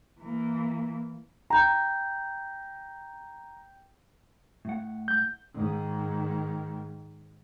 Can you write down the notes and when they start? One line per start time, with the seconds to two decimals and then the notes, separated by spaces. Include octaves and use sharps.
0.21 E3 A#3
1.50 G5 A#5 G6
4.65 A2 F#5
5.08 G6
5.54 G#2 D#3